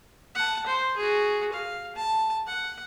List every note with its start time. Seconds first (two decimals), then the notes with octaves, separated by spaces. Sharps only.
0.35 F#5 A5
0.66 C5
0.97 F#4 G#4
1.53 F5
1.96 A5
2.47 F#5